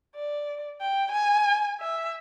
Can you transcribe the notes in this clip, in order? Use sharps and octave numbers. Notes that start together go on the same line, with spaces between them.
D5
G5
G#5
E5